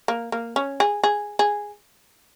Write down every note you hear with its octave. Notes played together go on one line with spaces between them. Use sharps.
A#3
A#3
C#4
G#4
G#4
G#4